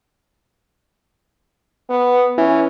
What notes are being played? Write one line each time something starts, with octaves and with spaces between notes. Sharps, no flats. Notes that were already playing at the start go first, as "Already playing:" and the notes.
B3
E3 C#4